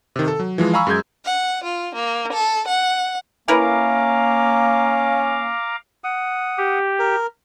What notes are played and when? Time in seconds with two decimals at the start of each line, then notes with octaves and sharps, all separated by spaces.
0.16 C3 D#3
0.28 A4
0.40 F#3
0.58 E3 F3 G#3
0.73 F5 G#5 A#5 B5 C#6 E6
0.87 F#2 G#3 G#4 G6 G#6
1.25 F#5
1.64 F4
1.95 A#3
2.32 A4
2.67 F#5
3.48 A#3 C#4 E4 A#4 B4 F5 A#5 D6
6.04 F#5 D#6
6.58 G4
6.99 A#4